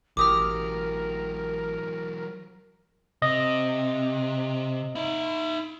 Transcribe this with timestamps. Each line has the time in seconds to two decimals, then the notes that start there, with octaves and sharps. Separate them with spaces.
0.17 A1 E3 F#3 G4 A#4 D6 D#6 F6
3.22 C3 D#5
4.95 D#4 E5